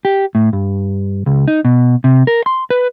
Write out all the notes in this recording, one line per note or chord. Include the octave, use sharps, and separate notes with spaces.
G4
A2
G2
C#2
D#4
B2
C3
A#4
C6
B4